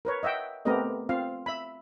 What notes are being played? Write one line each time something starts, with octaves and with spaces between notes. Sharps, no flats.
A#4 B4 C#5
D#5 E5 F#5 G5
A3 B3 C4 G4 A#4 D#5
C4 F4 F5
E5 B5